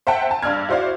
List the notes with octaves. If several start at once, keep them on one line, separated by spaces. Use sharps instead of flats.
C5 E5 F#5 G5 A5
G#5 A5
G2 D4 D5 E6 F6 G#6
E4 F#4 C5 D5 F5